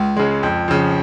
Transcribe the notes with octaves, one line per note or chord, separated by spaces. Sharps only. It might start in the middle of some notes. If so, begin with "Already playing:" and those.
Already playing: C#2
C#3 G#3
F2
C#3 F3